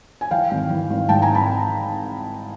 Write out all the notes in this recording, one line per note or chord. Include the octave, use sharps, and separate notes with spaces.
G#5
E3 F5 G5
G#1
E3
G#1
G#2 G5 A5
G#5 A#5
A5 B5